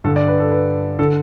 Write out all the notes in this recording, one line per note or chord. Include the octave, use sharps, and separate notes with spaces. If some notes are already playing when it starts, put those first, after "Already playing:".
G2 D3 A4
D5
B4
A4
B4
D3 A4